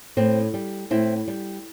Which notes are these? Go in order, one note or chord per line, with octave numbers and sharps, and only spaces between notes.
A2 C4
G3
A2 C4 E4
G3